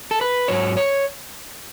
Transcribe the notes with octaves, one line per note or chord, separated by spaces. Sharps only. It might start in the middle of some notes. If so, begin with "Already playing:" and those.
A4
B4
G#2 F#3 C#5
C#5